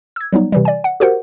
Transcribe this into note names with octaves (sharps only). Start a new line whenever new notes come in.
E6 G#6
F#3 G3 B3 D#4
C3 E3 G3
D5 G#5
F#5
F#4 G4 A#4 C5 F#5